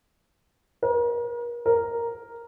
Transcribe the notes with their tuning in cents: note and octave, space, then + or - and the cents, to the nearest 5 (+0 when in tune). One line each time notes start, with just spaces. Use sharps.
A#4 +40
A#4 +0